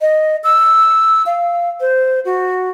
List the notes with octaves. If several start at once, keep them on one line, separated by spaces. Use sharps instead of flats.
D#5
E6
F5
C5
F#4